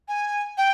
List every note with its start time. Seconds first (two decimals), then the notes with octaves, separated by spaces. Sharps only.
0.08 G#5
0.58 G5